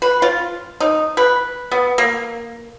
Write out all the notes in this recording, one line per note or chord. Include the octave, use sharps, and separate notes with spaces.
B4
F4
D#4
B4
B3
A#3